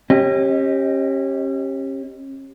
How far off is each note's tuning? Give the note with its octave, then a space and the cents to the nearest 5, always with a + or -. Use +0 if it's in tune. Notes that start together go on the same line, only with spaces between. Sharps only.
C#4 -35 G4 +0 D#5 +0